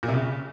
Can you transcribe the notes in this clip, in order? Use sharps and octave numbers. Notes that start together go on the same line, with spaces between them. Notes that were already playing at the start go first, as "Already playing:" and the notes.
A#2
C3
C#3